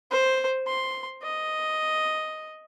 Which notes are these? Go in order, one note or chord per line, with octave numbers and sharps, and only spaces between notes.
C5
C6
D#5